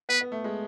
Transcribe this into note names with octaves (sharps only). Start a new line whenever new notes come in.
B3 B4
B3
A3
G#3